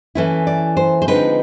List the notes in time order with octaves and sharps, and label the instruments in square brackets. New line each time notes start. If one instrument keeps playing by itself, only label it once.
[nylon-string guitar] E3 A3 C#4 E4
D5
C5
C5
D3 F3 G#3 C4 D#4 B4